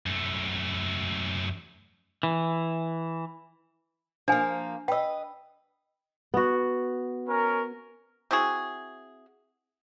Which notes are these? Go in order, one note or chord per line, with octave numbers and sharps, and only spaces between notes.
F#2 A3
E3
F3 A#3 D4 G#5
B4 D#5 G5 E6
B3 F#4
C#4 A#4
C4 E4 F#4 G#4